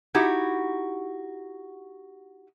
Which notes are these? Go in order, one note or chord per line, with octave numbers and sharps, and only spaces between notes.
D#4 E4 F#4 G4